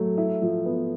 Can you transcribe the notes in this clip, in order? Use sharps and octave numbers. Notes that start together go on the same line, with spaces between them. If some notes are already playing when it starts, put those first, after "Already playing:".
Already playing: F#3 A3
E4
F3
B3